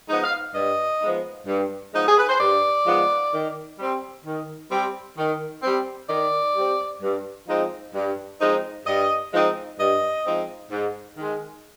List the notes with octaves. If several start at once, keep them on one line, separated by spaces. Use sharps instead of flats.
F3 G#3 B3 D#4 D#5
F5
G2 D#5
F3 G#3 B3 D#4
G2
F3 G#3 B3 D#4
G#4
B4
C5
G2 D5
F3 G#3 B3 D#4
D#3
G3 C4
D#3
G3 C4
D#3
G3 C4
D#3 D5
G3 C4
G2
F3 G#3 C4 D#4
G2
F3 G#3 C4 D#4
G2 D#5
F3 G#3 C4 D#4
G2 D#5
F3 G#3 C4 D#4
G#2
D#3 G#3